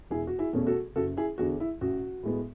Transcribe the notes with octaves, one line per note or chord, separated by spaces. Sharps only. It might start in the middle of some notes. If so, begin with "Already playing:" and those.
E1 E4 G#4
F#4
E4 G#4
E2 B2 A3 C#4
F#4 A4
F#1 F#4 A4
E4 G#4
E2 D3 F#4
E4
A1 F#4
A2 G#3 B3